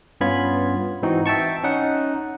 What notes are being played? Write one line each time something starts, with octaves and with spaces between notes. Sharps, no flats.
G2 B3 C#4 F4 B5 G#6
G#2 E3 C4 D#4 F#4
E5 G5 A5 C#6
C#4 D#4 F#5